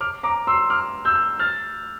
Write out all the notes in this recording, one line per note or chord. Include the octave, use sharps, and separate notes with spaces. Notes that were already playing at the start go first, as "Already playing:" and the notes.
D6 F6
A#5 D6
C6 E6
D6 F6
E6 G6
F6 A6